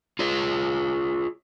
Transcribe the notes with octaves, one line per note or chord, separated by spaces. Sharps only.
F4 G#4 C#5